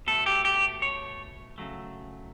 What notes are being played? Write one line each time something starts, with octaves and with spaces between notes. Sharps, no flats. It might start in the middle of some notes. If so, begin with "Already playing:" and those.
B2 A3 A4
G4
G4
C#5
C#3 F#3 A3